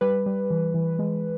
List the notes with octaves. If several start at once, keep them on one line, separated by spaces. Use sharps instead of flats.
G3 B4
G3
E3
E3
G#3